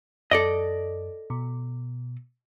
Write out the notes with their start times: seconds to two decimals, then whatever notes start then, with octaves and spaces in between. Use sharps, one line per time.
0.31 F#2 A4 D5 D#5
1.30 B2